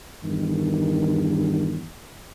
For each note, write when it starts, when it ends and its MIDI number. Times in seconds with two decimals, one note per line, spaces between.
0.22 1.86 40
0.22 1.86 43
0.22 1.86 51